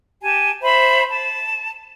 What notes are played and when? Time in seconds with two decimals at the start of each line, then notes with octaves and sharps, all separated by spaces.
0.22 G4 G#5 A5
0.61 C5 E5 B5
1.09 A5